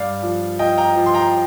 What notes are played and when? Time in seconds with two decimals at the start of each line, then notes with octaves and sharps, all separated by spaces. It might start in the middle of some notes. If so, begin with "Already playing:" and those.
Already playing: G2 D5 F5
0.23 F3
0.59 F3 D#5 G5
0.78 G5 A#5
0.96 F3
1.06 C6
1.14 G5 A#5